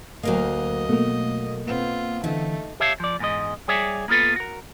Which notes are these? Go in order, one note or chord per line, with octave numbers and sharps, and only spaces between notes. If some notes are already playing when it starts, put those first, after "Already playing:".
D2 F#3 A#3 A#4 D#5 F5
B2 A3 A#3
B3 C4 F4
D3 E3 A3 D#4
G4 C#5 E5 F5 A5
F3 D5
E2 G#2 C#3 G#3 D#5
G3 G#4 C#5 D5 E5 G#5
A#3 B3 F4 A4 B4
F#4 A#4